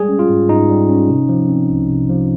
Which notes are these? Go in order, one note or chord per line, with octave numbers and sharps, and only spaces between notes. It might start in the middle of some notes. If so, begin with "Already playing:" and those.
Already playing: G3 G#3 G#4
C#4
F4
G#2
G#2 D#4
G3
C#4
C3
F3
C4
C2
C3
F3